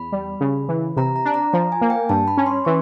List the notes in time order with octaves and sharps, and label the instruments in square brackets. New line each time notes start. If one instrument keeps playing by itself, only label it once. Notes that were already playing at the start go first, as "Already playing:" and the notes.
Already playing: [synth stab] E2 [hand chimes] B5
[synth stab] G3
C#3
E3
[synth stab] C3 [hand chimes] A#5
[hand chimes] A#5
[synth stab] D4
[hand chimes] A#5
[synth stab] F3 [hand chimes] A#5
[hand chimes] G#5
[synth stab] A#3
[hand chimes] G5
[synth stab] G2 [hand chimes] A5
[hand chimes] B5
[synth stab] C#4
[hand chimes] C6
[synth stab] E3 [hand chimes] C#6